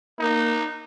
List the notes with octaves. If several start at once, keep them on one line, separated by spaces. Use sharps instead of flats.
A#3 D#4